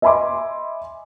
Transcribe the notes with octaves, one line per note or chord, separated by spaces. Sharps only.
D#5 E5 G#5 B5 C6 D6